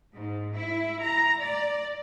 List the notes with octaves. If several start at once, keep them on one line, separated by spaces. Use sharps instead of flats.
G#2
E4
A#5
D5